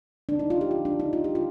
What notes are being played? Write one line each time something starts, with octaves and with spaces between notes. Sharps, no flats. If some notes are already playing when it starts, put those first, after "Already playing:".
D4
D#4
F4
G4
F4
D4
D#4
F4
G4
F4